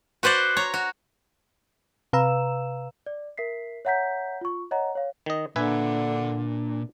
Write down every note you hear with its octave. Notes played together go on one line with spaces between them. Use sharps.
F#4 B4 C5 D5 F#5
C#5 A#5
F#4
C3 B4 F5 A#5 E6 E7
D5
A#4 E5 B6 C7
C#5 E5 F#5 A#5 G6 B6
F4 C#6
C#5 D#5 F#5 A#5
C#5 F5
D#3 D#5
A#2 D3 D4 B4 E5 G#5